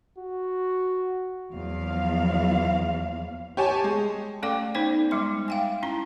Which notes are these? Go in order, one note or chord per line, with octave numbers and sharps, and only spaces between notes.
F#4
E2 F3 F#3 F5
G4 C#5 G#5 A5
G#3
A3 C#4 A4 D5 G5 D6
B3 D#4 C5 D5 G5
G3 G#3 C6
F5 G5 G#5
C#4 E4 A#5